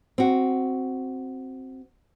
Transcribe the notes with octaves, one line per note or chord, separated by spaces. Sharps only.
C4 F#4